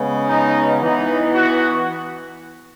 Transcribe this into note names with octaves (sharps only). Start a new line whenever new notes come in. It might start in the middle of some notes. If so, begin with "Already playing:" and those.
Already playing: C#3 G#3 B3
D#4
E3 B3 D#4
F#4